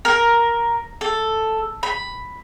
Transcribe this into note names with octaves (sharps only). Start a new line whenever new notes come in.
A#4
A4
B5